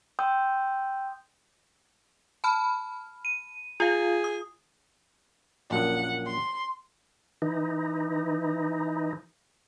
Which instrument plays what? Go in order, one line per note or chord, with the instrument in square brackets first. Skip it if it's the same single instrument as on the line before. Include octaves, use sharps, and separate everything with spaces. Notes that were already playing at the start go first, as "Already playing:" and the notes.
[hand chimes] G5 C6 D#6 E6 G6
[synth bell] A5 B5 F6
D#7
[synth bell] F4 F5 [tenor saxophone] G#4
[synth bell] D#6
[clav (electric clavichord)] A#1 F#2 A#2 [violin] F#5
[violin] C6
[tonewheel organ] E3 D#4